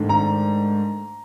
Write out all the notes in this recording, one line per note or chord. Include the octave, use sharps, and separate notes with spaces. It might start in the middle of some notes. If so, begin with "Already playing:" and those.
Already playing: G#2 D#3 A3 D4
A#5